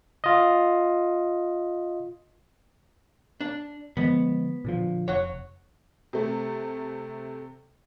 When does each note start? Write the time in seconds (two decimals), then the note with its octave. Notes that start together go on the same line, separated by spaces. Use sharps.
0.24 F4 D#5
3.41 D4
3.97 D3 F3 G#3 B3
4.65 A#2 D3 F3
5.08 F1 C#5 F#5
6.13 C3 A3